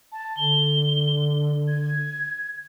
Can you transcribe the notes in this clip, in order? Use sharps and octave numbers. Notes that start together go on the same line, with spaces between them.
A5
D3 G7
G#6